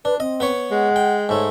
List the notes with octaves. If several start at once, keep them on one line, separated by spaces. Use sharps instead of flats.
D4 B4
C4 D#5
B3 B4 C#5
G#3 F#5
G5
G#2 A3 C#5